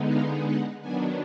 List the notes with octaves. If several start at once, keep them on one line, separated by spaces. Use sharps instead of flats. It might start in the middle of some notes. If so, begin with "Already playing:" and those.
Already playing: D3 G#3 B3 D#4
F5
F#5
D#3 F#3 B3 D4 G#5